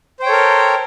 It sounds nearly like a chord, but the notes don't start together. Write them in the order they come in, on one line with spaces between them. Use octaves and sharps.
C5 G5 C#5 A4 A#4